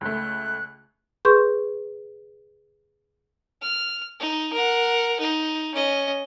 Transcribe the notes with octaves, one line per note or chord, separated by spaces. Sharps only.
C#2 A3 F#6
G#4 B4 C6 C#6 G6
F6
D#4
A#4 F#5
D#4
C#4 D#5